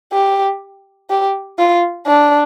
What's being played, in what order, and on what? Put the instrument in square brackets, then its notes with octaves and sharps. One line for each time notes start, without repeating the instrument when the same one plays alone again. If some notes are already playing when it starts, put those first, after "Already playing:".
[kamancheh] G4
G4
F4
D4